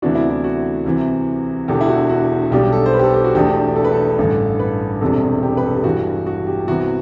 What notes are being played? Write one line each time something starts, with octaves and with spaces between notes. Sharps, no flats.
D2 C3 E3 B3 D4 F#4
E4
E4
F#4
C2 C3 E3
E1 E2 D3 G4
E4
F#4
F#4
B1 B2 G3 D4 G4
A4
C5
B4
G4
A4
G4
F#4
E1 E2 B2 A3 D4 G4
A4
B4
A4
A1 G2 D3
B4
E1 E2 C3 G3 D4 A4
G4
B4
A4
G4
G2 E3 G3 F#4
F#4
G4
C2 C3 E3 B3 F#4